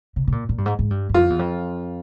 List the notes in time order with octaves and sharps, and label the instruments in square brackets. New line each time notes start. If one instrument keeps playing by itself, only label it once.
[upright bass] C3
C3
A#2
A#2
G2
G#2
G#2
G2
G2
[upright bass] F2 [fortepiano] F4
[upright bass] E2
F2